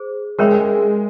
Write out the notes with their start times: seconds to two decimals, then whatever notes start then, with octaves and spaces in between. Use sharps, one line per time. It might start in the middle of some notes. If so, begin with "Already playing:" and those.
Already playing: G#4 C5
0.38 G#3 A#4 C#5 E5 G5 B5